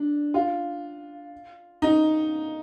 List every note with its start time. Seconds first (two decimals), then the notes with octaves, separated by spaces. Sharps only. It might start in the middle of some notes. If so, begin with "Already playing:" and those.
Already playing: D4
0.34 F4
1.82 D#4